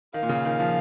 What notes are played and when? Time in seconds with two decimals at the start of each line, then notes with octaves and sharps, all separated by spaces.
0.14 D#3 F5
0.23 A#2
0.29 C#3
0.45 D#3
0.60 F3